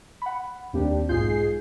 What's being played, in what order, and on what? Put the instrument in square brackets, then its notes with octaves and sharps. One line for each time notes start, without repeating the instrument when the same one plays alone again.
[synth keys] F#5 B5
[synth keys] D#2 A#3 C4 [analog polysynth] D4 G4
[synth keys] B1 F4 G6 [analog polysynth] G#2 G#4 C7